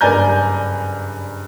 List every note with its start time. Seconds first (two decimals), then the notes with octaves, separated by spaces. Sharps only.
0.01 F#1 G2 D5 G#5 A#5 G6